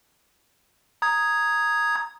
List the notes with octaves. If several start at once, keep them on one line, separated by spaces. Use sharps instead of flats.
A#5 D#6 G#6